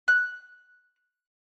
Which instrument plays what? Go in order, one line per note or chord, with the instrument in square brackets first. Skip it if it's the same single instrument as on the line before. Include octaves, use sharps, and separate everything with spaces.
[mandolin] F#6